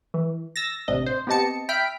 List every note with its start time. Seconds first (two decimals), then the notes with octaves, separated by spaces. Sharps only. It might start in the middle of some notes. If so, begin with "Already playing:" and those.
0.14 E3
0.56 E6 A6 A#6
0.88 A1 C3 D4 D#5
1.06 C5
1.27 B3 C4 G4 D#5 A5 C#7
1.69 E5 G5 B5 F6 B6 D7